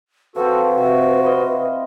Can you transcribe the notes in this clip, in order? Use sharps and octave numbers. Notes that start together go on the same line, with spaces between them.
F3 C4 F#4 A4 B4
C3 F#4
E4 F4 D#5